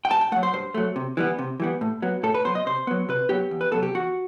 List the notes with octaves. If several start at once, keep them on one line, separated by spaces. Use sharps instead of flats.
G5
G2 A5
G5
F#3 A3 F#5
C5
G2 C5
F#3 A3
C3
E3 G3 B3
C3
E3 G3 B3
A2
F#3 B3
A2 A4
B4
F#3 B3 C5
D#5
C3 C5
F#3 B3
C3 B4
F#3 B3 G4
E2
B4
C3 F#3 B3 A4
G4
E2 F#4